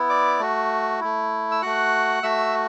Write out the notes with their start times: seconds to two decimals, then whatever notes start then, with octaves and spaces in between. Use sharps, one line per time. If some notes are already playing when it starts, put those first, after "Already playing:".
Already playing: B3 E4
0.09 D5 D6
0.39 A3 F#4
1.00 A3 E4
1.51 E6
1.62 A3 F#4 F#5 F#6
2.23 A3 F#4 E5 E6